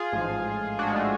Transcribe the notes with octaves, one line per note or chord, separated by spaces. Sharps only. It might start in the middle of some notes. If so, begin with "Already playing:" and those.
Already playing: F4 G#4
A1 G#2 F3
D4 F#4
G#3
A3